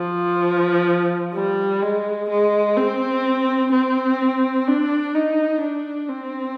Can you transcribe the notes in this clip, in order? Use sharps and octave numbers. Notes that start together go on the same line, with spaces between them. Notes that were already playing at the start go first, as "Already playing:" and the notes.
Already playing: F3
G3
G#3
G#3
C4
C4
D4
D#4
D4
C4